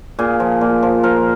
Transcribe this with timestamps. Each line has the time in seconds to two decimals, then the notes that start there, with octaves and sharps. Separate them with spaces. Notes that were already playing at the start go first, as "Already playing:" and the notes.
0.19 A#2 G#4
0.40 F3
0.61 A#2
0.83 F3
1.03 F3 A#4